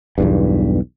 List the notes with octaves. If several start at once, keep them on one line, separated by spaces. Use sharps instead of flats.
B1 E2 G2